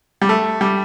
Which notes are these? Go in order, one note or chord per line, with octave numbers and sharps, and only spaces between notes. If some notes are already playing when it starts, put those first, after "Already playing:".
G3
A3
G3